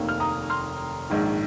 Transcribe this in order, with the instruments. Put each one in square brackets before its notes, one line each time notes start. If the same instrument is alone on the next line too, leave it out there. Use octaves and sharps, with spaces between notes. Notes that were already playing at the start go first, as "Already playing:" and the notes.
Already playing: [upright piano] F1 D#2 D#3 A#3
F6
A#5 D#6
C6 F6
A#1 G#2 D#3